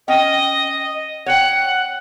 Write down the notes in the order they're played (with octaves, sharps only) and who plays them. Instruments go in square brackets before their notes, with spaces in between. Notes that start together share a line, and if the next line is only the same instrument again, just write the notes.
[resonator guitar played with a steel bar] C#4 G5 [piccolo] D#5
[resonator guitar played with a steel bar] C#5 G5 [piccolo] F#5